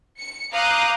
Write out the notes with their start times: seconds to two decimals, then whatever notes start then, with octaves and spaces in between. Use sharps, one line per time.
0.19 C#7
0.52 F5 A#5 D6 D#6 F#6 G6